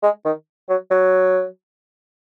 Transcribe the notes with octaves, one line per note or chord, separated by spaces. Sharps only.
G#3
D#3
F#3
F#3